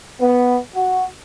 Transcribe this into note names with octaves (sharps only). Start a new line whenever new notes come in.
B3
F#4